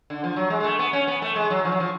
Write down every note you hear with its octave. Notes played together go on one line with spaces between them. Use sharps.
D3
F3
F#3
G#3
G#3
A3
B3
C#4
B3
A3
G#3
F#3
F3
F#3
F3